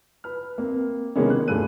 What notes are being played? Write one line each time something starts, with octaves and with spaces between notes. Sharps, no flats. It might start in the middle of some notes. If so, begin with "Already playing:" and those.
B4 F6
A#3 C4
C3 D#3 G#3 A#3 B3 C#4
F#6
D2 G2 G#4 A4 F#6 D#7